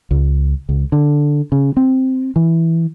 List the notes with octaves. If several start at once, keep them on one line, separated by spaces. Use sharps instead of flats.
C#2
C#2
D3
C#3
C4
E3